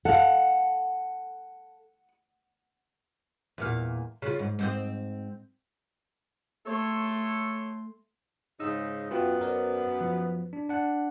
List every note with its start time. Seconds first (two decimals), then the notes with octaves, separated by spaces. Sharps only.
0.05 A4 F5 F#5
3.58 E2 A#2 F5
4.22 C#3 F4
4.39 G#2
4.59 G#2 C4 D#5
6.66 A3 A4 C#5 C6
8.60 G#2 C#3 D#4 E6
9.11 F#2 B3 F4 F#4 G5
9.41 A#4 C5 D5
10.01 F3
10.53 D4
10.69 D4 F#5